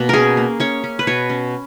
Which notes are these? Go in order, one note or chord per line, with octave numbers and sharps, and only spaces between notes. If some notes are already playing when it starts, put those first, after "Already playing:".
Already playing: B2 A#3
C#4 G#4 A#4
A#3
C#4 C#5
C#4
B4
B2 C#5
C#4